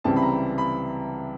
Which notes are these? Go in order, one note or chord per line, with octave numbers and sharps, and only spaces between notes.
C#2 C3 E3 G3 C4 A5
B5
A#5
B5